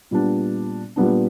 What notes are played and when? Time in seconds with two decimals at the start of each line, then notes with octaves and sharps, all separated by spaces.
0.11 A#2 G3 B3 D4
0.96 A#2 G3 B3 D4